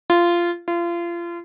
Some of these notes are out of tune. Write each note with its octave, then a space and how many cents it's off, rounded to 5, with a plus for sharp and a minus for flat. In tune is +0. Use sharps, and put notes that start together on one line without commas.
F4 -15
F4 -30